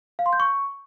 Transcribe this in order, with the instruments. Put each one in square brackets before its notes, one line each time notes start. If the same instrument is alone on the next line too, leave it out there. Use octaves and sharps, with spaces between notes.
[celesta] F5
C6
G6
C#6